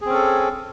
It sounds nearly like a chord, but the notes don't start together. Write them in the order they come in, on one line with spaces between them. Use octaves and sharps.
G#4 C4 C#4 A4